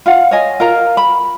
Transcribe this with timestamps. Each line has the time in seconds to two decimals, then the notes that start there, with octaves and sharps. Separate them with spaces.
0.06 F4 F5 F#5
0.31 C#5 D#5 G#5
0.60 F4 A#4 A#5
0.97 B5